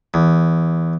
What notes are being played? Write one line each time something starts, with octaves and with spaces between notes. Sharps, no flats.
E2